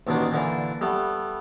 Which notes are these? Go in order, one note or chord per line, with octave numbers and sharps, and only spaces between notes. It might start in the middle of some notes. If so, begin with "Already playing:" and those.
A1 D#2 B2 D#3 D4
A#2 D3 E3
G3 A3 B3